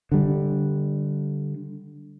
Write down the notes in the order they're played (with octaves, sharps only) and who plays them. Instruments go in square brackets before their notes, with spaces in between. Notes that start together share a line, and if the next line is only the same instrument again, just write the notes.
[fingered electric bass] D3 G3